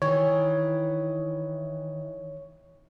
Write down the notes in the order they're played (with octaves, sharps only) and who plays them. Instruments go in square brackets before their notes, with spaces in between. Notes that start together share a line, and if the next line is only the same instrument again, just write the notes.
[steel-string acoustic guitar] D#3 E3 [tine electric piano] C#5